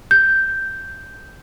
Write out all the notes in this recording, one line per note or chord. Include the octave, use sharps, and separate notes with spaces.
G6